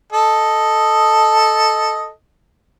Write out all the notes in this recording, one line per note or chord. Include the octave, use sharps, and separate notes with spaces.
A4 D#5